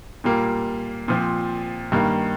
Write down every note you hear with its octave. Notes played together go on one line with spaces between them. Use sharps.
A#2 G3 A#3
A#2 F3 C4
G2 D#3 A#3